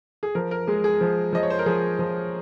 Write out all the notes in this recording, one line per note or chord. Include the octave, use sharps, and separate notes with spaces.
G#4
F3 A#4
A#4
G#3 G#4
G#4
F3
F3 D#5
C#5
C5
A#4
F3 G#4
F3